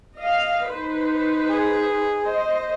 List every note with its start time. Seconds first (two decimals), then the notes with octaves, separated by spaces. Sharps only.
0.20 D#5 F5
0.69 D#4 B4 C5
1.49 G#4
2.24 C5 D#5